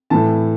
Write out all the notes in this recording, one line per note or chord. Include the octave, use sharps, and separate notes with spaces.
A2 E3 A5